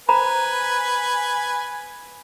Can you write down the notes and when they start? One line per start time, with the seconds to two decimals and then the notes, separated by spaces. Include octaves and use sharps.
0.09 B4 C5 G#5 A#5 B5